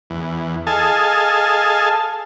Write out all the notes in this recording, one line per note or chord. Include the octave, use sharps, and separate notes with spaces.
E2
G#4 A4 D#5 F5 G#5 A5